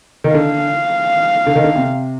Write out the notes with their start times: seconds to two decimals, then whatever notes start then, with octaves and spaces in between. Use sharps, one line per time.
0.24 D#3
0.34 D3 F5
1.47 D3
1.55 D#3
1.64 D3
1.76 C3